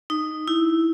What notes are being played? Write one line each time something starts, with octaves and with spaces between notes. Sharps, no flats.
D#4
E4